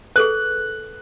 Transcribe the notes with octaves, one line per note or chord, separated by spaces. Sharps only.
G#4 A4 B4 F#6